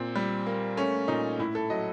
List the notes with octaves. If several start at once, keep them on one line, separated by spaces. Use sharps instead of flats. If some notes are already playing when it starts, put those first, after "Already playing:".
Already playing: A#2 C4
G3
A#3
A3 C#4
A#2 D#4
A2 E4
A4
F#3 D#5